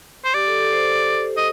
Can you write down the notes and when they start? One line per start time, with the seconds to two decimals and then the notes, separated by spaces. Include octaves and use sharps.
0.24 C5
0.34 G4 D5
0.47 A4
0.60 A4
0.73 C5
1.37 D#5